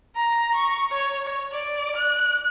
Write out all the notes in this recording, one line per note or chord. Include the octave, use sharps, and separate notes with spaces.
A#5
C#6
C#5
D5
F#6